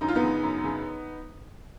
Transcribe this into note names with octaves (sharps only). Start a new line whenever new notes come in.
F#2 D#4
F4
B3 D#4
C#3
F#2
C#3